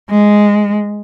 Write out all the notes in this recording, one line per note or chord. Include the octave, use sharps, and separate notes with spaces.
G#3